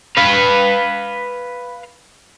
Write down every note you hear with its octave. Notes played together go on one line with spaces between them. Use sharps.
B4 F5